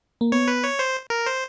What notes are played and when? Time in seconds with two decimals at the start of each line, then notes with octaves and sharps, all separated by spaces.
0.21 A#3
0.32 B3 C#5
0.48 B4
0.64 C#5
0.79 C5
1.10 A#4
1.26 C5